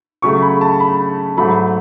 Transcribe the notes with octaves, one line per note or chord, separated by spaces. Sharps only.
C#3 F#3 A3 C#6
B5
A5
B5
G#2 F#3 A3 B5